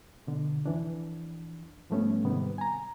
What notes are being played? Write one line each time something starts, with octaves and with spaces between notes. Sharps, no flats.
B2 D3
F2 E3 D4
G#2 F3 G3 A3 B3 C#4
G#2 C3 D#3 G3 B3
G#5 A#5